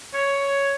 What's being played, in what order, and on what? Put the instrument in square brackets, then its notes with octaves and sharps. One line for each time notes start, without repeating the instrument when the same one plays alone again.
[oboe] C#5